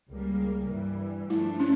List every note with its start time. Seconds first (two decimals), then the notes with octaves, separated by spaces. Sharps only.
0.09 C#2 C#3 G3 A#3
0.69 G2 E3 G3
1.30 G2 F3 A3 D4 E4
1.60 C#4